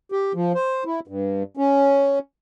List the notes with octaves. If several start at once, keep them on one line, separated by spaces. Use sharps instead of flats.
G4
F3
C5
E4
G2
C#4